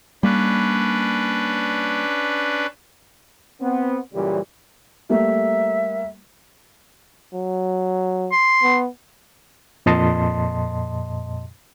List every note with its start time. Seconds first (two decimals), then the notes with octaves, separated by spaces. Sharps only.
0.23 G3 A#3 C#4 D4 B4
3.61 B3 C4
4.14 F#2 A#2 C#3 E3 G3
5.09 G3 A3 A#3 E5
7.33 F#3
8.32 C6
8.63 B3
9.86 F2 A#2 D#5 A5 C6